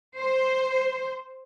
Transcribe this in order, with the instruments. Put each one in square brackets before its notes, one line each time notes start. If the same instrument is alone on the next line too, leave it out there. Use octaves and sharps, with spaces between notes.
[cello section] C5